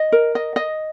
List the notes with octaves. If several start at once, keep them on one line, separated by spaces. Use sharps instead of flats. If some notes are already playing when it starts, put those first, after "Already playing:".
Already playing: D#5
A#4
D#5
D#5